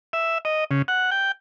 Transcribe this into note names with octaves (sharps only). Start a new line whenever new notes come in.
E5
D#5
C#3
F#5
G5